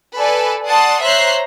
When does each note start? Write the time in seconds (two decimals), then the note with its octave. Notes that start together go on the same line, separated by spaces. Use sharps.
0.16 A4 B4 D5 G#5
0.65 D5 F#5 A5 C6 D#6
1.02 C5 C#5 E5 A#5 F#6 C7